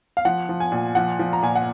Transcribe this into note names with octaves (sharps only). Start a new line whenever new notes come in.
F5
F3 F#5
F3
G#5
A#2
F3 F#5
F3
A#5
A#2 G#5
F#5